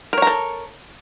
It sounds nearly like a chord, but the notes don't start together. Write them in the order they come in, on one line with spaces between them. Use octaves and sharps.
A#4 C#5 A#5 A4